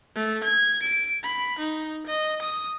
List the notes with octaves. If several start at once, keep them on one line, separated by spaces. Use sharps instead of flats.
A3
G#6
D7
B5
D#4
D#5
D#6